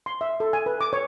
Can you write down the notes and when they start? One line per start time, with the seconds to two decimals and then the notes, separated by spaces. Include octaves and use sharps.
0.06 C6
0.21 E5
0.40 A4
0.53 G#5
0.66 B4
0.81 D6
0.93 C#5